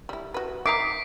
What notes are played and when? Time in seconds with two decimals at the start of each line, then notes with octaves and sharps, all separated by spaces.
0.09 G3 E4
0.34 F#4 B4
0.66 D#3 E5 A#5 D6 B6 C7 D7